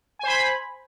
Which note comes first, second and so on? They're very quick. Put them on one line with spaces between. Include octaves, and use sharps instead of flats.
G#5 C5 B5